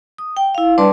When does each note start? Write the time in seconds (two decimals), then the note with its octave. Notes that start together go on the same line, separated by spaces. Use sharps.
0.18 D#6
0.37 G5
0.55 E4 F5
0.78 G3 D4 B4 D5 A5 C6